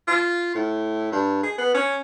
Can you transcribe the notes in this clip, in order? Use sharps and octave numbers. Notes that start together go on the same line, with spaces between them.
F4
A2
G2
G#4
B3
C#4